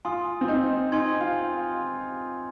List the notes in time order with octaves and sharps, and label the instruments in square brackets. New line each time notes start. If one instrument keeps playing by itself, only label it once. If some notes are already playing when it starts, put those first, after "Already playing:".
[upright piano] F4 [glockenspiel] G#5 C6 D#6
[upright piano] C4
D#4
[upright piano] D#4 [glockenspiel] G#5 C6 G#6
[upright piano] F4